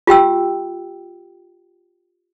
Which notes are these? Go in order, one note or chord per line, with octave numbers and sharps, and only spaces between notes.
F4 G4 G5 E6